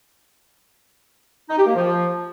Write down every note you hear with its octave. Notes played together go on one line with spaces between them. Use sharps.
D#4
G4
A#3
F3